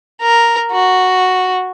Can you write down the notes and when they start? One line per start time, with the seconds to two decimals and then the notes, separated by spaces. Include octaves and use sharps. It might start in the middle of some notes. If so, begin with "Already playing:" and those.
0.22 A#4
0.71 F#4